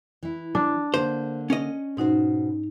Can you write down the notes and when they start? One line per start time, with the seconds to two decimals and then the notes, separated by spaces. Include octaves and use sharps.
0.23 E3 E4
0.55 D4
0.94 D3 A#3 C5
1.50 C#4 D#5
1.97 G#2 B2 D#4 F#4 C5